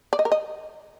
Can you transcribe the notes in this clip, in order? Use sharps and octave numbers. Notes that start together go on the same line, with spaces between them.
D5
D#5
A#4
D#5